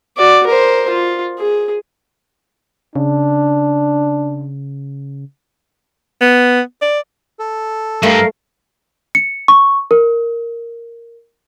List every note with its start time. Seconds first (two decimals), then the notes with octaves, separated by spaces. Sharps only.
0.18 F#4 D5
0.47 A#4 C5
0.89 F4
1.39 G#4
2.96 C#3 D4
6.21 B3
6.82 D5
7.39 A4
8.03 G2 A3 A#4 F5
9.15 C#7
9.48 C#6
9.91 A#4